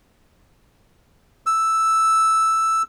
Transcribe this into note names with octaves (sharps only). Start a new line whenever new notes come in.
E6